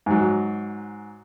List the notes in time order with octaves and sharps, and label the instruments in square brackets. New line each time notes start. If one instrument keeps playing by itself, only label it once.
[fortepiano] G#2 F#3